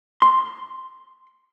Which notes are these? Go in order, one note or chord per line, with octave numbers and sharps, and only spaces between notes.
C6